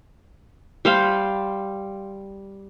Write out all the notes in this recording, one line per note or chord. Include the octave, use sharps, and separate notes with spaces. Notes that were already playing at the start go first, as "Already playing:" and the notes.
G3 C5 F5 B5